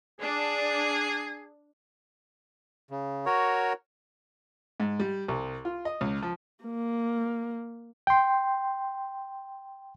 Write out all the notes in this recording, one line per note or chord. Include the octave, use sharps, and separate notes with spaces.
D4 G#4
C#3
F#4 A#4 C#5
G#2
G3
C2
F4
D#5
C#2
F3
A#3
G5 C6